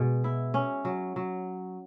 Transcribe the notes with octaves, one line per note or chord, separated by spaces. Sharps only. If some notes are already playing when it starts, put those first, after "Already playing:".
Already playing: B2 G#3
E4
C#4
F#3
F#3